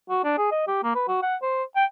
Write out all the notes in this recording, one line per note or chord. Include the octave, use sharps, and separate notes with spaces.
F#4
D4
G#4
D#5
G4
A#3
B4
F#4
F#5
C5
G5